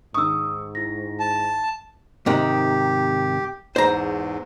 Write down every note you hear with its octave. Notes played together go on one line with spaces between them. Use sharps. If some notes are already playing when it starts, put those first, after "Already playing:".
G#2 D#3 C#6 D#6 E6
E4 A#6
A5
G#2 C3 D#3 G4
E2 G#2 C5 A#5